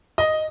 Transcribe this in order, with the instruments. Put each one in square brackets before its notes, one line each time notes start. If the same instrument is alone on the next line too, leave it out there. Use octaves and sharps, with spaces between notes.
[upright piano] D#5